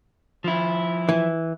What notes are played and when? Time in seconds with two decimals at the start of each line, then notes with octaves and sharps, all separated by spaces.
0.44 F3 E4
1.09 E3